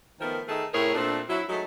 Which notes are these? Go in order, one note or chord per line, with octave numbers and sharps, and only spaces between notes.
D#3 F3 A3 B3 A#4
D#3 A3 D#4 G#4 A4
A2 C3 G#4 A#4 C#5
A#2 A3 C4 D4
F#3 E4
F#3 G#3 A3 D#4